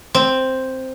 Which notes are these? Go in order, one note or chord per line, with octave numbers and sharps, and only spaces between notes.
C4